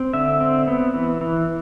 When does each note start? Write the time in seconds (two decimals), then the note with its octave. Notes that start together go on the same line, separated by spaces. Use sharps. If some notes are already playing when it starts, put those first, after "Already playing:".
Already playing: C4
0.13 D3 E5
0.40 C4
0.67 B3
0.94 E3
1.21 E3